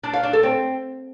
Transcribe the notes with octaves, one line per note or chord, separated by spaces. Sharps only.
D4
F5
D4
A4
C4